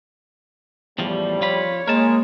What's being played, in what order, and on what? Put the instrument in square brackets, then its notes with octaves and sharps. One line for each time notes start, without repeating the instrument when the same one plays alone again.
[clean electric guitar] E2 A2 F3 [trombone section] G3
[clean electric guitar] F3 F4 B5 [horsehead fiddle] C#5
[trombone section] G#3 [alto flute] A#3 [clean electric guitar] A#4 A5